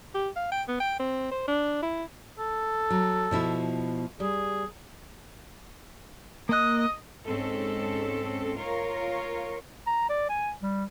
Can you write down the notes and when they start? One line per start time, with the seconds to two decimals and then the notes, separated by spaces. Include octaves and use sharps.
0.15 G4
0.36 F5
0.52 G5
0.68 B3
0.80 G5
0.99 C4
1.31 C5
1.48 D4
1.83 E4
2.39 A4
2.90 F#3
3.31 B2 F3 E4
4.20 G3 G#4
6.49 A#3 D#5 F#6
7.26 G#2 C4 C#4 A4
8.56 F4 A#4 C#5
9.87 A#5
10.10 D5
10.29 G#5
10.62 G3